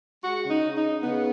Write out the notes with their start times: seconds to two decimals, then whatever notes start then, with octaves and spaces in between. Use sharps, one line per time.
0.23 G#3 F#4
0.44 C#3
0.51 D#4
0.63 C#3
0.78 D#4
0.83 C#3
1.04 C#3 B3